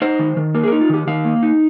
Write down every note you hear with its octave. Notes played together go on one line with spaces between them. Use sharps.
D#4 C5
D#3
D#3
A#3 A#4
G#4
A#4
D#4
F4
D#3 G4
D#3 F5
A#3
D#4